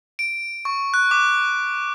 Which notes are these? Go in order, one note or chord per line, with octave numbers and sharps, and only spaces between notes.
D7
C#6
F#6
D6